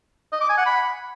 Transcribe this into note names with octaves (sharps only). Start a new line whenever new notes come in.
D#5
D6
G#5
F#5
B5